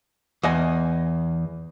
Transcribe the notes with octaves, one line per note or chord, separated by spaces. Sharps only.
E2 D#5 G#5